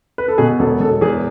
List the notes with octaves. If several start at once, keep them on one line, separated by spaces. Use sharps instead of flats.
B4
A4
B2 G#4
E1 A4
E1 A4
E2 G#4